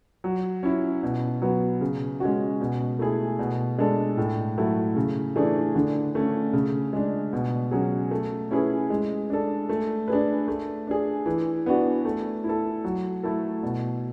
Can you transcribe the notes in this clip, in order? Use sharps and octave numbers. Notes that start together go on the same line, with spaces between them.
F#3
C#4 E4
B2
F#3 B3
C#3
G#3 C#4 F#4
B2
A3 E4 G#4
B2
G#3 D4 A4
A2
F#3 A3 E4
C#3
E3 A3 D4 G#4
D3
A3 C#4
C#3
G#3 D4
B2
F#3 C#4 G#4
A3
C#4 E4 G#4 B4
G#3
D4 A4
A3
D4 G#4 B4
A3
D4 G#4
E3
B3 D4 F#4
A3
E4
A4
F#3
A3 E4 A4
B2